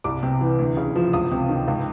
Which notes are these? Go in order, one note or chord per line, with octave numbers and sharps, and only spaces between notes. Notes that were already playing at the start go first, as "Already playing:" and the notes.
C2 D6
C3
E3
D2
C#3
F3
C#2 D#6
C3
D#3
C#2